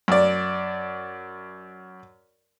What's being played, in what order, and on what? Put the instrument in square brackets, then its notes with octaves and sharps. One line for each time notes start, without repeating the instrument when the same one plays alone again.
[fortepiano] F#2 D5